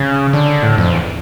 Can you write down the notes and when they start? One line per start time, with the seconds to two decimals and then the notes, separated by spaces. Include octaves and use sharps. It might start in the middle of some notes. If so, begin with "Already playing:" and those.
Already playing: C#3
0.33 D3
0.63 A2
0.78 F2
0.92 E2